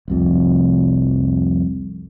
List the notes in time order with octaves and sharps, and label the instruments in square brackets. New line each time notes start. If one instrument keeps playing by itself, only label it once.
[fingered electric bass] F1 C2 F2